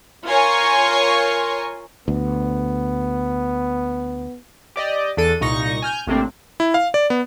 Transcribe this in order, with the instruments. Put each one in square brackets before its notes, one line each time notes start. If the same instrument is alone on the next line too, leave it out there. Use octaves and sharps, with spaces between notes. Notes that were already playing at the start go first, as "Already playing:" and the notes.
[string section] F4 A#4 C#5 G#5 C6 C#6
[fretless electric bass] D2 [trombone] B3
[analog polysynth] G4 D5 D#5
E2 D4 A4 D#7
C2 A#2 D#4 C#6 A#6
G#5 F6 G6
A1 A2 C3 A#3 C4 D4
[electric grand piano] E4
F5
D5
B3